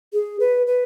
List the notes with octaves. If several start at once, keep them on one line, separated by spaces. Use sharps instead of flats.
G#4
B4
B4